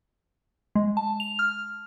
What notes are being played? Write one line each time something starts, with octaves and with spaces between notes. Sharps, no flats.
G#3
A5
F7
F6